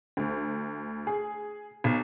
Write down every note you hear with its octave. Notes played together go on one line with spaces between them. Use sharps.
D2
G#4
B1